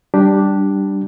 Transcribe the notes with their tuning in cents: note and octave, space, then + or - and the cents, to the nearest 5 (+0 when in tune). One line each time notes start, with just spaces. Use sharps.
G3 -5 D4 +0 G4 -10